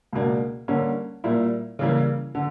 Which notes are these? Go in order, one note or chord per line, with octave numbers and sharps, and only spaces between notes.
C#2 B2 A#3 D4
D3 G3 A#3 C#4
A#2 G3 A#3 E4
C#3 E3 G3 A#3
D3